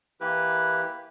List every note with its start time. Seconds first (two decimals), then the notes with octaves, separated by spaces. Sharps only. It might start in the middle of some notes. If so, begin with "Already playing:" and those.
0.21 E3 A#3 E4 G4 B4